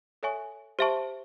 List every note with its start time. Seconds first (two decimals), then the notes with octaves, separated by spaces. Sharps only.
0.23 A4 C#5 E5 G#5 C#6
0.79 G4 C5 E5 A5 C#6